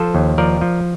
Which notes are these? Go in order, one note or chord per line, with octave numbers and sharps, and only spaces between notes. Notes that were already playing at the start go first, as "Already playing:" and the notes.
Already playing: F3 A4 C5
D#2
F3 A#4 D5
F3